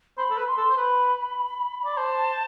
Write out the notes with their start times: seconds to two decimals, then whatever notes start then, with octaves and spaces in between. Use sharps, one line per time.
0.18 C5 B5
0.30 A4
0.38 B4
0.48 C6
0.57 A4
0.70 C5
0.77 B4 B5
1.85 D5
1.97 C5 A5